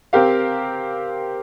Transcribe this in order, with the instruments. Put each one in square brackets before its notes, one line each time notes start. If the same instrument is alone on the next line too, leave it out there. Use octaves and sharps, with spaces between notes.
[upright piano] C4 G4 A#4 F5